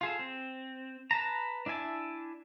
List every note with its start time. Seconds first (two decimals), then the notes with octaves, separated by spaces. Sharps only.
0.01 F4 G#4 A4
0.19 C4
1.11 B4 A5 A#5
1.66 D4 E4 E5 G#5 A5